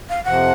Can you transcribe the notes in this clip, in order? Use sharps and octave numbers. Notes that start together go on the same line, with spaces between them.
F5
F2 C3 F3 F#5